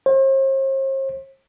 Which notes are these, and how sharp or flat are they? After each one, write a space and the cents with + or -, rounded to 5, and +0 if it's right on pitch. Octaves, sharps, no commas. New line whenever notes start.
C5 +45